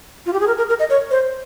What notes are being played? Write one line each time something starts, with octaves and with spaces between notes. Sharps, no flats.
F4
G4
G#4
A#4
A#4
A#4
D#5
C#5
C5